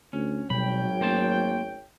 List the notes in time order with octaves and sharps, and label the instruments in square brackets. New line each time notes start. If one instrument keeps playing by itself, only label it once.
[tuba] D2 [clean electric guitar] C#4
[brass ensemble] G#1 C#5 G5 [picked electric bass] B2 G3 [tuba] F#3 [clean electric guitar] B5
[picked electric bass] A3 C#4 [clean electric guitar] A#3 C5 A5